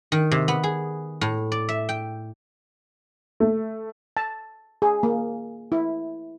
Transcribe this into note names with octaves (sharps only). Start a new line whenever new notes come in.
D#3
C3
B3
G#4
A2
D5
E5
G5
A3
A5
G#4
A#3
E4